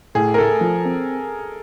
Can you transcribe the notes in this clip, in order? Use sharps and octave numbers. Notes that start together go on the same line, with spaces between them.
A2 G#4
A#4
A3 A4
F3
C4